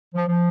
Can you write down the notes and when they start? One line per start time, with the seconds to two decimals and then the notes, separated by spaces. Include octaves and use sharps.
0.14 F3
0.28 F3